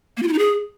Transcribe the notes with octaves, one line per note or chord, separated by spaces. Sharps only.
A#3
F4
E4
D#4
G#4